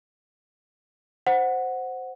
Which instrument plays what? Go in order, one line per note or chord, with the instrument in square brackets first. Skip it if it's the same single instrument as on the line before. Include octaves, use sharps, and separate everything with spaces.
[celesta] C5 F#5